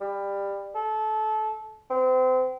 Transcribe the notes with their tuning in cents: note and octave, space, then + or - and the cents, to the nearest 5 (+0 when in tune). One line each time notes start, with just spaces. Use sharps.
G3 +20
A4 -25
C4 -30